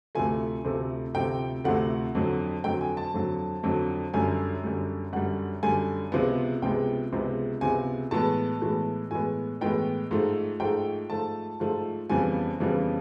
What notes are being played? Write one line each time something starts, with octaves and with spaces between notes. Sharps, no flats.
D2 C3 F3 A3 G#5
D2 C3 F3 A3
D2 C3 F3 A3 G5
D2 C3 F3 A3 F#5
F2 D3 F#3
F2 D3 F#3 G5
G#5
A5
F2 D3 F#3
F2 D3 F#3
F#2 D3 G3 G#5
F#2 D3 G3
F#2 D3 G3 F#5
F#2 D3 G3 G#5
C#2 C3 F3 G#3 B3
C#2 C3 F3 G#3 B3 G5
C#2 C3 F3 G#3 B3
C#2 C3 F3 G#3 B3 G#5
A2 E3 G#3 B3 A5
A2 E3 G#3 B3
A2 E3 G#3 B3 G#5
A2 E3 G#3 B3 G5
G#2 F3 A3
G#2 F3 A3 G5
G#2 F3 A3 A5
G#2 F3 A3
F2 C#3 E3 G3 B3 G#5
F2 C#3 E3 G3 B3